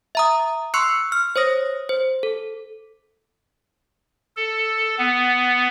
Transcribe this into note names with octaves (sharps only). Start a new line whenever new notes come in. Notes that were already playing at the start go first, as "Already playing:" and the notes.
E5 A#5 D#6
C6 C#6 E6 F#6 C7 C#7
F6
C5 C#5 D#6 A#6
C5
A4
A4
B3